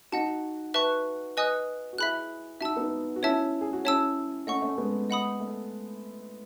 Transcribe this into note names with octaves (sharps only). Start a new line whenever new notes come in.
D#4 F#4 D#5 F#5 A5
B4 E5 A5 C#6 F#6
B4 D#5 G#5 D#6 F#6
F#4
E4 G#4 E5 B5 F#6
D#4 F#4 E5 A5 E6
B3 D#4
F#4
C#4 E4 C#5 E5 A5 E6
G#4
F#4
C#4 E4 C#5 E5 A5 E6
A3 C#4 D#5 F#5 C#6
A3 C#4
G#3 B3
D#5 F#5 B5 D#6
A3